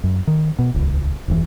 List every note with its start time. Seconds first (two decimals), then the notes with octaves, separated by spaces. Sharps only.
0.04 F#2
0.27 D#3
0.59 B2
0.74 D#1 C#2
1.28 D#1 F#2 E3